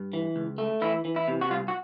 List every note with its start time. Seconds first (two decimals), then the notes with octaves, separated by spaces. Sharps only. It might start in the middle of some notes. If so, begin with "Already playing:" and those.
Already playing: G2
0.13 E3
0.36 C#2
0.58 A3
0.81 E3 E4
1.05 E3
1.16 E4
1.28 C3
1.41 F#4
1.51 C2 F4
1.68 F#4